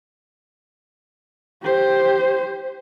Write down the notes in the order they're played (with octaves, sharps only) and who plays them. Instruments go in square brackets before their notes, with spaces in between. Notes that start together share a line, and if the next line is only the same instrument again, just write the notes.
[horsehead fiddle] G4 C5